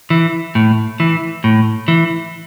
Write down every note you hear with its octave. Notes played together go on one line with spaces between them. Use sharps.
E3
A2
E3
A2
E3